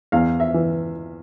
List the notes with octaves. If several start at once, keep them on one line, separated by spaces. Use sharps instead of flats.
E2 F5
E5
E3